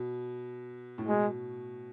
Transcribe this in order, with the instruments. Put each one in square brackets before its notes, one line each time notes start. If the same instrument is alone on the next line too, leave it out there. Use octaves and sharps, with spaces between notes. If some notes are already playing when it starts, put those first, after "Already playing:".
Already playing: [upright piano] B2
A2
[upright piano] B2 [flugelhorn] G#3